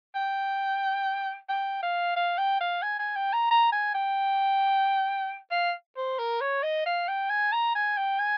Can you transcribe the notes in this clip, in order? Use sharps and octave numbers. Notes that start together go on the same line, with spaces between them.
G5
G5
F5
F5
G5
F5
G#5
G#5
G5
A#5
A#5
G#5
G5
F5
C5
A#4
C#5
D#5
F5
G5
G#5
A#5
G#5
G5
G#5